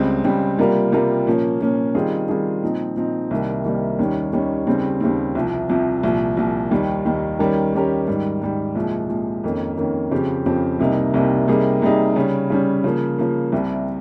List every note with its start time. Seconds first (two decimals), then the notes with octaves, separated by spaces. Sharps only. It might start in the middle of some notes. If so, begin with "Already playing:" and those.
Already playing: C#2 C#3 G3 C4
0.24 C#2 C#3 G3 C4
0.59 C3 G3 A#3 F4 A#4
0.92 C3 G3 A#3 F4 A#4
1.26 A#2 F3 A#3 C#4
1.60 A#2 F3 A#3 C#4
1.95 D#3 G3 C4 F4 G#4
2.28 D#3 G3 C4 F4 G#4
2.63 A#2 F3 C4 D#4
2.96 A#2 F3 C4 D#4
3.31 C2 C3 D#3 G3 A#3
3.65 C2 C3 D#3 G3 A#3
3.99 D#2 D#3 G3 C#4
4.33 D#2 D#3 G3 C#4
4.67 D#2 C#3 G3 C4
5.00 D#2 C#3 G3 C4
5.35 C2 C3 F3
5.69 C2 C3 F3
6.03 C2 A#2 F3
6.37 C2 A#2 F3
6.71 D#2 D#3 G3
7.05 D#2 D#3 G3
7.39 D#3 G3 C#4 G4 A#4
7.73 D#3 G3 C#4 G4 A#4
8.07 G#2 D#3 G3
8.42 G#2 D#3 G3
8.75 C2 A#2 F3 G#3
9.09 C2 A#2 F3 G#3
9.44 F2 D#3 A#3 C#4
9.78 F2 D#3 A#3 C#4
10.11 F2 C#3 F3 C4 G4
10.46 F2 C#3 F3 C4 G4
10.79 C2 C3 G3 A#3 D#4
11.14 C2 C3 G3 A#3 D#4
11.48 C3 G3 A#3 D#4 G#4
11.82 C3 G3 A#3 D#4 G#4
12.16 C#3 G3 C#4
12.50 C#3 G3 C#4
12.84 C#3 F3 A#3
13.18 C#3 F3 A#3
13.52 C2 C3 G3